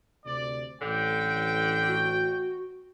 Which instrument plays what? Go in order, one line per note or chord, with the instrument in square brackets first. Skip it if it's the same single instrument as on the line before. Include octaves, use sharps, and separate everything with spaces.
[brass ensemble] D2 C3 D5
[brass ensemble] A1 G5 [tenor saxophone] D3
[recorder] F#4